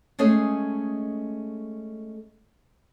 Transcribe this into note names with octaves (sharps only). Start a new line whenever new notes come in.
G#3 A3 C#4 G#4 A4 D#5